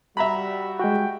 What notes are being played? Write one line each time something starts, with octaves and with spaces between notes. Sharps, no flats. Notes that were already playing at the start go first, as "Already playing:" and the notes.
G3 F#4 E5 A#5 B5
G#3 F#4 G5